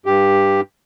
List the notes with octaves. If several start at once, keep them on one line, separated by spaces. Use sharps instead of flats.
G2 G4